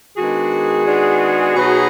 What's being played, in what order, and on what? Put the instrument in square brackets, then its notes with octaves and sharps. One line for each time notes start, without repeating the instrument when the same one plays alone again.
[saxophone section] D#3 G#3 B3 D4 F#4 G#4
D#3 G#3 B3 D4
B2 F#3 B3 D#4